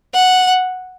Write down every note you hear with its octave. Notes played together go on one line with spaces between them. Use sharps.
F#5